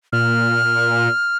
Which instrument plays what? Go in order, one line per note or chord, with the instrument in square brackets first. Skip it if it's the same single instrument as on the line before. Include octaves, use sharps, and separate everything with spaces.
[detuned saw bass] A#2 [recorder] F6